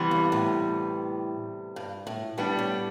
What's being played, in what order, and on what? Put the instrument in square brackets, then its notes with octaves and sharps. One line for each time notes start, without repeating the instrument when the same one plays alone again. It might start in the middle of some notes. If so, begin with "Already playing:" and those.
Already playing: [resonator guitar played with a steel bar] C3 E3 G3 B3
[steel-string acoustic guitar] G2
A2
G2
A2
[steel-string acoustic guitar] A2 [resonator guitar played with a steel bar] G3 B3 D4
[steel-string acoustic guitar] A2